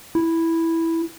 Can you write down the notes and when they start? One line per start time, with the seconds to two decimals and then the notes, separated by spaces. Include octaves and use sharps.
0.15 E4